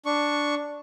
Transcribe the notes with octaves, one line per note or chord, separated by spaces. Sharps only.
D4 C#6